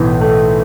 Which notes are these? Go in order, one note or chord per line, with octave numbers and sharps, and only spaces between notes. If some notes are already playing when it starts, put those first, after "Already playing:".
Already playing: B1 A2 E3
A3